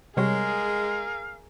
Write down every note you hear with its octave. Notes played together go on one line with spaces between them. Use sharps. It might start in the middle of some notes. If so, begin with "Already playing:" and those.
C3 G3 G#3 G#4 A#4 C#5 F5